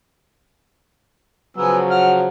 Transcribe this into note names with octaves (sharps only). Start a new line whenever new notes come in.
C#3 F3 F#3 B3 G#5 E6
F#5 F6